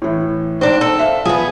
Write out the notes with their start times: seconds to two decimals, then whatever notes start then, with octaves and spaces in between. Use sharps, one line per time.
0.02 A2 E3
0.61 G#2 C4 D4
0.81 A4
0.99 E5 F5
1.25 F3 B3 G#4